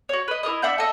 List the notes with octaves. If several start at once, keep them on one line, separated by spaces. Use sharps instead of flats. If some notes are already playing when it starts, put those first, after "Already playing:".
F#4 C#5
B4 D#5
E4 G4 A#4 D#5
D4 E5 F#5 G6
A4 D#5 E5